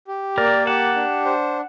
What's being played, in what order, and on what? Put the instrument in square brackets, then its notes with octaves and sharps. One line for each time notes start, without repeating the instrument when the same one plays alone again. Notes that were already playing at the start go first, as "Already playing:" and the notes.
[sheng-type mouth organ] G4
[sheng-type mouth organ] A#3 [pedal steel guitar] A#4 D5
[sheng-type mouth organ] G4 [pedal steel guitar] F#5 A5
[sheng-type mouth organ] D4
C5